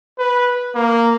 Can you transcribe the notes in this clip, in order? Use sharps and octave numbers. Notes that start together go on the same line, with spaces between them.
B4
A#3